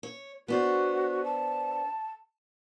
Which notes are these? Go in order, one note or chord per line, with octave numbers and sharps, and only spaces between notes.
C#5
B3 D4 F#4 C5
A5